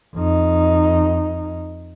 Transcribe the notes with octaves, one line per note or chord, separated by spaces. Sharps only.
F2 D#4